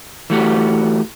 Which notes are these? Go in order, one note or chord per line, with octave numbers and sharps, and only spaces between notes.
E3 A3 F#4 G4